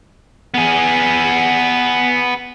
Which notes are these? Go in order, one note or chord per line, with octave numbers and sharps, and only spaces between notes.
B3 G#4